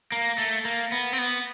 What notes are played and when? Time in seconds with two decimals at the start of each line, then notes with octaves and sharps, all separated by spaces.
0.12 A#3
0.38 A3
0.65 A#3
0.92 B3
1.13 C4
1.18 B3